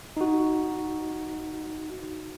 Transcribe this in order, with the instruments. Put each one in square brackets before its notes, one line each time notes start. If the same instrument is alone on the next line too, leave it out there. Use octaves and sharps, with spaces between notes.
[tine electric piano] D#4 F#4